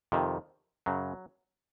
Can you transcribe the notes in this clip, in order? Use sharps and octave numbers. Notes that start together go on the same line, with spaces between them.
F2 C3 D#3
F#2 C#3 F#3